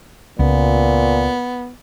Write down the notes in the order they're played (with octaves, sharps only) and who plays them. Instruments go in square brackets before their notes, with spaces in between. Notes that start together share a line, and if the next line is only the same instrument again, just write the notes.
[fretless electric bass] C#2 [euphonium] A#2 [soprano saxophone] B3